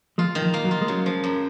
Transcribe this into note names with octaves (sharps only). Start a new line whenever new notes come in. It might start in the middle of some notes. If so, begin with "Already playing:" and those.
F3 G#3 F4
D#3
F3
A#3
F#3
F4
G#3
C#3 F#3
F3
F#2